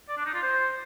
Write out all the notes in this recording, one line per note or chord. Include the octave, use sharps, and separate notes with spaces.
D5
D4
D#4
F4
C5